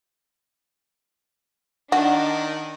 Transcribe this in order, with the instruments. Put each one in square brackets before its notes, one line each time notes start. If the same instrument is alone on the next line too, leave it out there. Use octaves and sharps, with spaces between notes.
[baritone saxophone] D#3 [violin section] D4 D#4 [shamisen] F#4